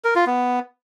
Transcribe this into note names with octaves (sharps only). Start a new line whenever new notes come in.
A#4
F4
B3